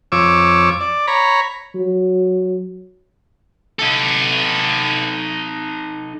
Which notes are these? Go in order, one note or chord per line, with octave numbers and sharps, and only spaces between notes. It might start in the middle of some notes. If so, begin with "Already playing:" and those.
F2 C#5 D6 E6
D5
C#5 A#5 B5
F#3
D#4 A4